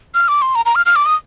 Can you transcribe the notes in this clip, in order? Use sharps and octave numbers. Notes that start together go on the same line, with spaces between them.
F6
D6
C6
A#5
A#5
F6
F6
D6
D#6